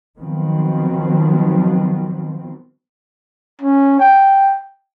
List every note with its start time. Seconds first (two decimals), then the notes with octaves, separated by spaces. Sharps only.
0.20 D#3 F3 F#3 B3 C4
3.61 C#4
3.99 G5